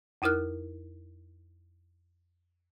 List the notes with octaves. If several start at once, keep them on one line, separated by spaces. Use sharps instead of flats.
F2 D#4 E4 A#4 F6 F#6